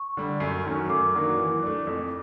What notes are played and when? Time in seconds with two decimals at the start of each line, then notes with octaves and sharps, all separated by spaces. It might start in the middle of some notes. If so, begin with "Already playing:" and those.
Already playing: C#6
0.17 D3 G3
0.40 F#2
0.65 D#3 F#3 A3 C#4
0.89 F#2 D6
1.14 D#3 F#3 A#3 D4
1.38 E3
1.63 A3 D4
1.87 F2